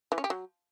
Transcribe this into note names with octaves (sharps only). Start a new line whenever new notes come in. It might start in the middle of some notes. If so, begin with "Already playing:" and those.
E3
C#4
G4
F#3